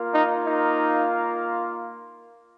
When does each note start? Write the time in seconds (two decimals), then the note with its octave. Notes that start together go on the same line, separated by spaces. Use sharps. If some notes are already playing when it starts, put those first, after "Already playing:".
Already playing: A#3 F4 A#4 F5
0.14 D#4
0.46 D#4